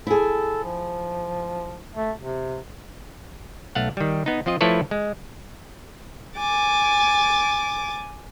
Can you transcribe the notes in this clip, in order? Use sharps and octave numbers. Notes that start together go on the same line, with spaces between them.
E4 G#4 A4
F3
A3
C3
B1 A3 F5 F#5
D#3 G3
B3 D#4
F3 C4 F4 D#5
F3 A3 E4 A4 B4 C#5
G#3
G#5 D6 A6